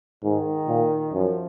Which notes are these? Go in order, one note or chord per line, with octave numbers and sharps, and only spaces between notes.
G#2 D#3
A#2
F#2 F3